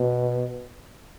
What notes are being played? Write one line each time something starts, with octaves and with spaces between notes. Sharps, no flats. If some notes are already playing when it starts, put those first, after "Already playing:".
Already playing: B2